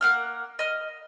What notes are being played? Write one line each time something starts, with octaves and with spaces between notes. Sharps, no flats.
A#3 F#5 F6
D#5 F6